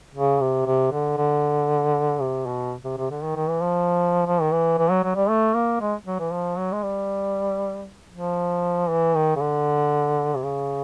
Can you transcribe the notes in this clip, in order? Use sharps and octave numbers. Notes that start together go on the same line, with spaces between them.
C#3
C3
C3
D3
D3
C3
B2
C3
C3
D3
D#3
D#3
E3
F3
F3
D#3
E3
E3
F#3
F#3
G3
A3
A#3
G#3
F#3
E3
F3
F#3
G#3
G3
F3
E3
D#3
C#3
D3
C3
C#3